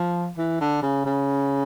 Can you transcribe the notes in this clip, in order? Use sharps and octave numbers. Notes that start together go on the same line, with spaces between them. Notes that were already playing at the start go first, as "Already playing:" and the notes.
Already playing: F3
E3
D3
C#3
C#3